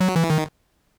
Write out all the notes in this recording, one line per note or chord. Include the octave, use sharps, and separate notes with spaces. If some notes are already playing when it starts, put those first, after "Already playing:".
F#3
E3
D#3